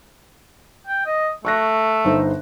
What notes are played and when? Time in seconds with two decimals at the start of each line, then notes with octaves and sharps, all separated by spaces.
0.87 G5
1.06 D#5
1.45 A3 C#6 F#6 A#6
2.05 G1 D#4 C5